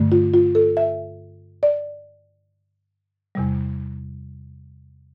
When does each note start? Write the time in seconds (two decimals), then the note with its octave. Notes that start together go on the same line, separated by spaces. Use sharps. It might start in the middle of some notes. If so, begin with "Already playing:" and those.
Already playing: G2 D3 A3
0.12 F4
0.34 F4
0.55 A4
0.77 E5
1.63 D5
3.35 E2 C3 G3